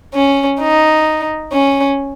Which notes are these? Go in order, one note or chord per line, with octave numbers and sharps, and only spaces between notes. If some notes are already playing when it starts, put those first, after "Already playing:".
C#4
D#4
C#4